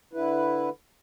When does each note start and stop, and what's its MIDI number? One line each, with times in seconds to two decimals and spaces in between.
0.13 0.69 50
0.13 0.69 64
0.13 0.69 71